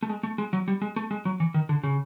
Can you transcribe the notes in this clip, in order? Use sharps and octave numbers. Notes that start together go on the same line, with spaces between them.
A3
G#3
A3
G#3
F#3
G3
G#3
A3
G#3
F#3
E3
D#3
D3
C#3